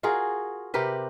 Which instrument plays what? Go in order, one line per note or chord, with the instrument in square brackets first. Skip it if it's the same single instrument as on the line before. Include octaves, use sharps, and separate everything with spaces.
[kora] F4 F#4 G#4 A#4
C3 G4 A#4 B4